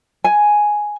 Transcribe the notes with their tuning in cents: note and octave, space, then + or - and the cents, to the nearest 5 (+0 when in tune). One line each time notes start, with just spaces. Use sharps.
G#5 +5